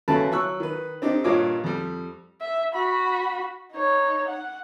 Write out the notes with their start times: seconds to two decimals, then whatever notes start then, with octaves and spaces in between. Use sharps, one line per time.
0.08 F#2 C#3 A3 B4 A5 B5
0.32 F#3 C#6 E6 F#6
0.60 D#3 B4
1.02 C4 D4 D#4 G4
1.24 G2 A#2 F4 C#5 D#5 D6
1.64 F2 G3
2.41 E5
2.74 F#4 B5
3.73 D#4 C#5
4.28 F#5